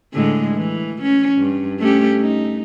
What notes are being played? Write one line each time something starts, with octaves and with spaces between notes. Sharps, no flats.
A2 D3 G#3
E3
C#4
G2
A3 C#4 G4
D#4